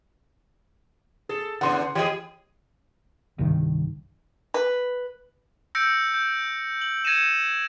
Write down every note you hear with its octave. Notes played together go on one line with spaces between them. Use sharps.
G#4 A4
E2 C#3 D4 F#5 C6
E3 G4 G#4 D#5
G1 C2 G2 D#3
B4
E6 G6 A#6 C#7 D7
G6
F#7
G#6 A#6 C#7 D#7 E7